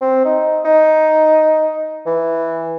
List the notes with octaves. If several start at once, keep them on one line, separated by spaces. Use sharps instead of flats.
C4
D#4
D#4
E3